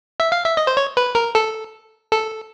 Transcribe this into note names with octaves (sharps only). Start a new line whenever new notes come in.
E5
F5
E5
D#5
C5
C#5
B4
A#4
A4
A4